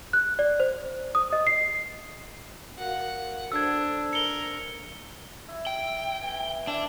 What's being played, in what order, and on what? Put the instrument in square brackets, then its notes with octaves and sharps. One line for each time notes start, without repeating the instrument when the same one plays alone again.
[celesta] F#6
D5
C5
D#6
D#5
C7
[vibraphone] F#4 A#4 F5 [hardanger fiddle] F#5
[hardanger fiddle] D4 [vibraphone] A4 C5 [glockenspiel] E6 G#6
[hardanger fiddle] A#4 [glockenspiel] C#7 G7
[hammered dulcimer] E4
[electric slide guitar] G5
[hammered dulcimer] E3
[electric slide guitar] D4 [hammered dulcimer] E4